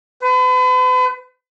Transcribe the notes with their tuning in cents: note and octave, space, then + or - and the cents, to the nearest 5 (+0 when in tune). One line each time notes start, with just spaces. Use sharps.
B4 +40